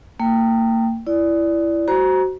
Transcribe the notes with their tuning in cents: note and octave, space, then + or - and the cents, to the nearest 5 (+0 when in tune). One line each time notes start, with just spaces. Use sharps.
A#3 -35 G5 +0
E4 +15 D5 -10
F#4 +20 C5 +0 A#5 +25